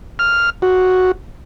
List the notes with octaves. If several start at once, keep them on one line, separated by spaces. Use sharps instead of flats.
F6
F#4